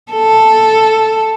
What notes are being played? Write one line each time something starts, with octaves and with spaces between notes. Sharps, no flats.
A4